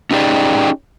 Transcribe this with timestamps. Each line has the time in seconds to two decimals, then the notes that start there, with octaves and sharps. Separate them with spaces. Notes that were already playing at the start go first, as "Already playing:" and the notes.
0.11 C#4 D#4 G4 G#4 D5